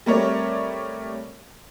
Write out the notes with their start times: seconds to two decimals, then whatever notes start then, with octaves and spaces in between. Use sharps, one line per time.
0.06 G3 A3 C4 A#4 C#5 D5